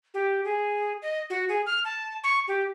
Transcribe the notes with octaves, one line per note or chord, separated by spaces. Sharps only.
G4
G#4
D#5
F#4
G#4
F6
A5
C#6
G4